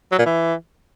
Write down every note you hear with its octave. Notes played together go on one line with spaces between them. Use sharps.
F#3
A#2
E3